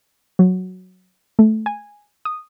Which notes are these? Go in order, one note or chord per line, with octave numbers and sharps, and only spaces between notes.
F#3
A3
G#5
D#6